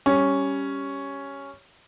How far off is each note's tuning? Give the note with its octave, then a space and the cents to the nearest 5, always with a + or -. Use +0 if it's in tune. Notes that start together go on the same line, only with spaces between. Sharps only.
G3 +0 C#4 +0